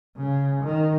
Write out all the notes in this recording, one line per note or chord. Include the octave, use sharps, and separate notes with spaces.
C#3
D#3